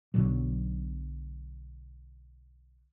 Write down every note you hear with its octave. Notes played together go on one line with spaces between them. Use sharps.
B1 B2 D3 F#3